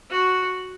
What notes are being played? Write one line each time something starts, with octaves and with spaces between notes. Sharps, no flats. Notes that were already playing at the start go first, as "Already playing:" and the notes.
F#4